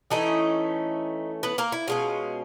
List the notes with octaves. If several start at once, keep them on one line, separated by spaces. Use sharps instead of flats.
E3 A3 C#4 D#4 E4 D#5
B3 B4
A#3 A#4
E4
B2 G#3 C#4 F4